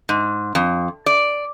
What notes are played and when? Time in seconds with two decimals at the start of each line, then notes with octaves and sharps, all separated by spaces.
0.09 G#2
0.55 F2
1.06 D5